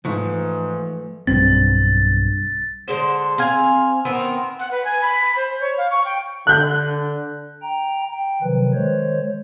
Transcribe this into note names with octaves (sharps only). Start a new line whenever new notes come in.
G#2 E3 F3 A3
B1 G2 C4 A6
D3 G#3 C5
C4 F5 G#5
D#3 B3 C4 A#4
F#5
B4
G#5
B5
B5
C5
C#5
F5
C#6
G5
D3 F#6 G6
G5 A#5
G5
C3 D#3 F3 F#3 B4
D#3 G#3 C5 C#5